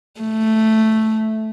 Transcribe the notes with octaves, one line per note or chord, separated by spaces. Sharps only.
A3